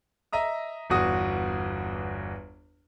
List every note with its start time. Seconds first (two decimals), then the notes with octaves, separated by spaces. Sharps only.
0.32 D#5 E5 A#5 D#6
0.90 G1 E2 F#4 D#6